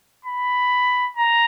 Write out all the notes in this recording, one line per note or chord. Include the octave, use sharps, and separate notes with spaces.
B5
A#5